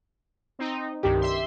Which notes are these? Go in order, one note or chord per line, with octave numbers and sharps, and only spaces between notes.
C4 D#4
C2 G2 D#3 G4
E5 C6